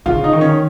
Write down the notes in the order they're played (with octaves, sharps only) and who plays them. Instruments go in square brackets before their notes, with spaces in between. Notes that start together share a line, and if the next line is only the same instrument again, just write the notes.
[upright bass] C#3 [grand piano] F4
[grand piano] D#4
[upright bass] D#3
[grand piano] C#4